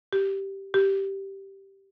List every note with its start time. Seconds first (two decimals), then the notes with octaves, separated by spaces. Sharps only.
0.13 G4
0.74 G4